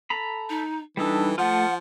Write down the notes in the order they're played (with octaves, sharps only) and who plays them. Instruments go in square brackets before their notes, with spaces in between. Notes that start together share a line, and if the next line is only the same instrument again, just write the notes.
[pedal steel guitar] A4 A#5 B5
[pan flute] D#4
[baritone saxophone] E3 [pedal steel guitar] G3 D#4 A4 [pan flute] D4
[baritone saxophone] F3 [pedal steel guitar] A3 F4 [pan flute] F#5